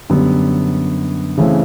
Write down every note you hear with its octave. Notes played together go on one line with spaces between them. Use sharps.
F#2 D3 G3 B3
C#3 E3 A3 C4